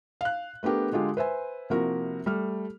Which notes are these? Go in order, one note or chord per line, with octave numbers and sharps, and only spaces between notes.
F5 F#6
A3 B3 D4 G4 A#4
D3 G#3 F4 G4
B4 C5 E5 G#5
C3 F3 A#3 E4 F#4 A#4
G3 A3 F6